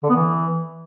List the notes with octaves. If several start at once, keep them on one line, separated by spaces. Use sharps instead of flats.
D3
B3
E3